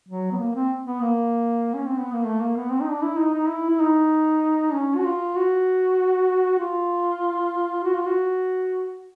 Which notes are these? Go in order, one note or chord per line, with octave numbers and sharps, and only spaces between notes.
F#3
B3
A#3
C4
B3
A#3
C#4
C4
B3
A#3
A3
A#3
B3
C4
D#4
D4
E4
D#4
D#4
E4
E4
D#4
C#4
F#4
F4
F#4
F4
F#4
F4
F#4